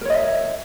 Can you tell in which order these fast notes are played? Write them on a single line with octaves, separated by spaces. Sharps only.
A#4 C#5 D#5 E5